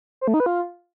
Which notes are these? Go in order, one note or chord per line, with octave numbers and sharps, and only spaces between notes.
C5
A3
D#4
B4
F4